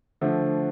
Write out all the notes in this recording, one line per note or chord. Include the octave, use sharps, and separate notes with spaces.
D3 F3 A3